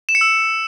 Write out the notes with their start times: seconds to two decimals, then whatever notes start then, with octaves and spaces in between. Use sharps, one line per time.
0.09 E7
0.15 C#7
0.21 E6